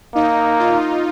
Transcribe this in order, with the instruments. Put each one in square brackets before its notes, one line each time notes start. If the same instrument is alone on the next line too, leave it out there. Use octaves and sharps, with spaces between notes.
[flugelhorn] A#3 [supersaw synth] D#4
[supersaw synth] F4